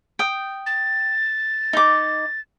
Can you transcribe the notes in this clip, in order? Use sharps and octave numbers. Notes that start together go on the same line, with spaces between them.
G5 D#6
A6
D#4 D6